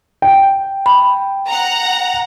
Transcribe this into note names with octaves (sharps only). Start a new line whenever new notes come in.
G5
B5
F#5 A#5